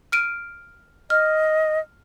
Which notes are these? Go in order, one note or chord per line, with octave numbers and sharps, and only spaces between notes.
F6 D7 D#7
D#5 F6